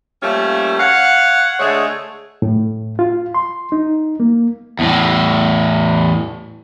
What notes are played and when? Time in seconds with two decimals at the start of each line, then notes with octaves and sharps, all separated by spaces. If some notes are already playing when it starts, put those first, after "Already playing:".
0.23 F3 G3 A3 A#3 C#4
0.80 C#5 F5 F#5
1.60 D3 G#3 A3 G#4 C#5
2.42 A2
2.99 F4
3.35 C6
3.72 D#4
4.20 A#3
4.79 E2 A2